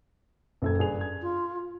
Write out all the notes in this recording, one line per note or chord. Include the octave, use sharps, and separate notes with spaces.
F#1 A4 G#6
G2 G#4 F7
G#6
F4